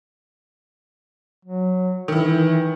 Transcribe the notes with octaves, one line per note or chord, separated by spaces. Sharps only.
F#3
D#3 E3 E4